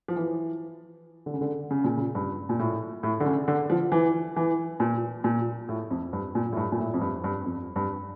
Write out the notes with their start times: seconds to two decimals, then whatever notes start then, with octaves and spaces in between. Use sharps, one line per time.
0.08 F3
0.16 E3
1.26 D3
1.34 C#3
1.41 D3
1.71 C#3
1.84 A#2
1.97 C#3
2.15 G2
2.49 A#2
2.59 A2
3.03 A2
3.20 D3
3.26 C#3
3.48 D3
3.70 F3
3.92 E3
4.36 E3
4.80 A#2
5.24 A#2
5.69 A2
5.90 F2
6.13 G2
6.35 A#2
6.52 A2
6.57 G2
6.72 A#2
6.79 A2
6.94 F2
7.01 G2
7.24 G2
7.46 F2
7.76 G2